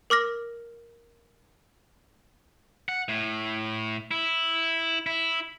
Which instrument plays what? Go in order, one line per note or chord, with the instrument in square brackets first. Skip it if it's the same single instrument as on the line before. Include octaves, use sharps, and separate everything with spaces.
[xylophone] A#4 D6 F6 A#6
[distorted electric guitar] F#5
A2
E4
E4